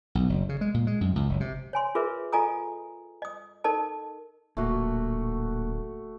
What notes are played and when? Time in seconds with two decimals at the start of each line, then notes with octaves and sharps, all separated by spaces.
0.15 B1
0.29 F#1
0.49 C#3
0.61 G#3
0.74 A#2
0.87 G#3
1.01 F#2
1.16 C#2
1.29 F#1
1.40 C3
1.73 C#5 G#5 C6
1.95 F4 G#4 A#4 B4 E5
2.33 F4 A4 D#5 G#5 A#5 D#6
3.22 D#5 D#6
3.64 D#4 A4 A#4 D#5 A5
4.57 D1 A#2 A3 A#3 F#4